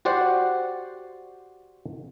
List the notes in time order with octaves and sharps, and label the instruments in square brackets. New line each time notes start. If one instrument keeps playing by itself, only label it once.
[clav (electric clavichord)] F#4 G4 C5 D5 F#5